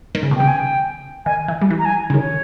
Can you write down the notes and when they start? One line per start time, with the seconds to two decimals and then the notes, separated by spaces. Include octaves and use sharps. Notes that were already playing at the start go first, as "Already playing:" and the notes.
0.15 D#3
0.23 C#3
0.31 B2
0.36 C#3 G5
0.48 G#5
0.58 G5
1.25 D#3 G#5
1.48 E3
1.61 G3
1.70 E3
1.79 A#5
1.85 G#5
2.10 C#3
2.14 D#3 C#5